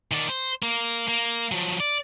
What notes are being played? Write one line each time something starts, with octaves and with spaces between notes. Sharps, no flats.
D#3 D5
C5
A#3
A#3
F3 F#3
D5